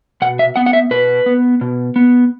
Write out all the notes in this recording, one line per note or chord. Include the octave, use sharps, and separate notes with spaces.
B2 F#5
E5
B3 F#5
F#5
E5
B2 B4
B3
B2
B3